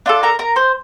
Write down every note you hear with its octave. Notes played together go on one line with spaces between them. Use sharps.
D4 F4 A4
A#4 A#5
A#4 A#5
C5 C6